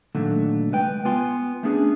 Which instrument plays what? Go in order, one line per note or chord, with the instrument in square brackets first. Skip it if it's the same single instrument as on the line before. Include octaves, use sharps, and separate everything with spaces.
[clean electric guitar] A#2 D3 D#3 F#3 A3
C2 G#3 B4 G5
B3 F4 G#5 C6
A3 B3 C#4 D4 G#4